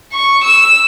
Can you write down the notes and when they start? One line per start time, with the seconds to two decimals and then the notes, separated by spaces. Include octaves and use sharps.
0.13 C#6
0.44 E6